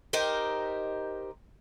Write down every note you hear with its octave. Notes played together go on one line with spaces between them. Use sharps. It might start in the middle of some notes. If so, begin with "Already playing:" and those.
D#4 G4 A#4 C5